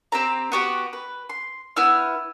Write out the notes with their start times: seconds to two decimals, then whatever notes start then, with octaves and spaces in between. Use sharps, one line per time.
0.12 C4 G4 A#5
0.52 B3 F#4 G4
0.93 B4
1.29 C6
1.76 B3 E4 F6